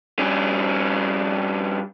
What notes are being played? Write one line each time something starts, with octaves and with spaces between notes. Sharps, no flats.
G2 C#4